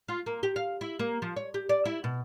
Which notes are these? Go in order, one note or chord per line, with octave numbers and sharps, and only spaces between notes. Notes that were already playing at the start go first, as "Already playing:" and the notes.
F4
A#3
G4
F5
E4
A#3
F3
C#5
G4
D5
E4
B2